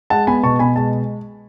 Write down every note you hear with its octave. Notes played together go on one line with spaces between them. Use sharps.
G#3 F#5 A5
B3 G#5 B5
B2 A5 C#6
B2 G#5 B5
G#3 A5